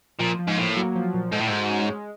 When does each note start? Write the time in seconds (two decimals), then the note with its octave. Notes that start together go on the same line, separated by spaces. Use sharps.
0.19 A#2 F3
0.39 F3
0.47 G#2
0.57 A2 A#3
0.76 F#3
0.95 F3
1.14 A#2
1.32 G#2 A4
1.40 A2
1.47 G#2
1.52 F#4
1.70 C#4
1.89 G#3